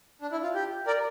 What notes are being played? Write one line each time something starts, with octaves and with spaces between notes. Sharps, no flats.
D4
E4
F4
G4
A#4 D5